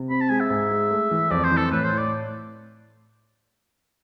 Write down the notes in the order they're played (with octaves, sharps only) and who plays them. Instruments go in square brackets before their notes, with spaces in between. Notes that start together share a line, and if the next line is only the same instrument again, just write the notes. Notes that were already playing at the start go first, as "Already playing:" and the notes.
Already playing: [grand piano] C3
[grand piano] C4 [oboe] B5
[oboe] A5
[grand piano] G#3 [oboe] G#5
[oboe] E5
[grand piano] G#2
G#3
A3
E3
[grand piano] F2 [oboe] D5
[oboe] C5
[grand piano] E3
[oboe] A4
[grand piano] A2 [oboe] B4
[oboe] C5
[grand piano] A2
[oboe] D5